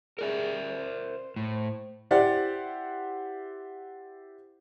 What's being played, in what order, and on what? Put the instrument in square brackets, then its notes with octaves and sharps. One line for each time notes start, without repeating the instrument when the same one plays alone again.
[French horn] G#4 [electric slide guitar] A#4 D5 E5
[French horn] C5
[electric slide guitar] A2
[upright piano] E4 G4 C5 D5 F#5